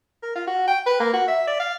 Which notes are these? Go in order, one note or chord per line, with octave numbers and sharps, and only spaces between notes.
A#4
F4
F#4
G5
B4
A#3
F#4
E5
D5
F5